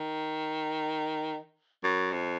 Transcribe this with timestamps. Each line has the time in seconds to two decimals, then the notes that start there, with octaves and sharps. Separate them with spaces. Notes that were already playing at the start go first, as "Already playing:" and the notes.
Already playing: D#3
1.84 F#2
2.12 F2